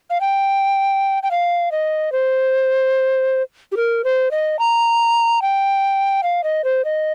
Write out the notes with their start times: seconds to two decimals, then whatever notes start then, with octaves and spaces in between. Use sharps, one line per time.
0.10 F5
0.21 G5
1.23 G5
1.31 F5
1.72 D#5
2.12 C5
3.72 G4
3.77 A#4
4.04 C5
4.31 D#5
4.59 A#5
5.42 G5
6.23 F5
6.44 D#5
6.64 C5
6.85 D#5